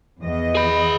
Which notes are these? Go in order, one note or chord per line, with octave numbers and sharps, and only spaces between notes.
E2 D#5
G#4 B5